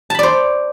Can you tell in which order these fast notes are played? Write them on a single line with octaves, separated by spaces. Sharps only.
A5 B5 D5 C5